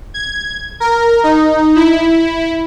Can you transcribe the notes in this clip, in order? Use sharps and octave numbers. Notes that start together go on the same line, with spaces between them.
G#6
A#4
D#4
E4